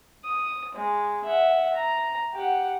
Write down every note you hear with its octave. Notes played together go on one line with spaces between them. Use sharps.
D#6
G#3
E5 F#5
A#5
G4 F#5